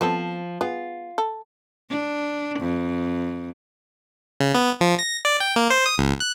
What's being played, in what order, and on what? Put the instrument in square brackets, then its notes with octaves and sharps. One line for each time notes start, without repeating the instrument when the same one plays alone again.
[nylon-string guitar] F3 [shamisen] B3 C4 A4
[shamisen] B3 G#4 [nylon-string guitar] F4
[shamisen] A4
[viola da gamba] D4
F2
[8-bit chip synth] C#3
B3
F3
A#6
D5
G5
A#3
C5
D#6
C#2
F#6